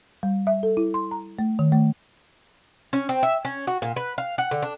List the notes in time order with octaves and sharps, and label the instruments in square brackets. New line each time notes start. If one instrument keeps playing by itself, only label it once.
[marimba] G3
E5
A4
E4
C6
A#5
A3
D#3
A3
[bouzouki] C#4
C4
E5
C#4
F#4
A#2
B4
F5
F#5
D3
D4